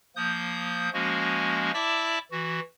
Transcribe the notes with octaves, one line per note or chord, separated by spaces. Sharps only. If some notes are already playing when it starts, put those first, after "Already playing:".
F3 A#3 D#6 G6
F3 G#3 A#3 C#4 F#4
E4 D5 E5 A5 D6 E6
E3 F#4